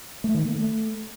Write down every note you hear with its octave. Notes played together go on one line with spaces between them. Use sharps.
A3
D#3
A#3
A3